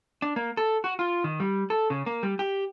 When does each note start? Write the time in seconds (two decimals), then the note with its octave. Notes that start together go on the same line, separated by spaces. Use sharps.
0.22 D4
0.36 A#3
0.57 A4
0.84 F#4
0.99 F4
1.24 D#3
1.40 G3
1.70 A4
1.90 C#3
2.06 A#3
2.23 G3
2.39 G4